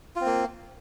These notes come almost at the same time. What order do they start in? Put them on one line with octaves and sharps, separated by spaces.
F4 C4 A#3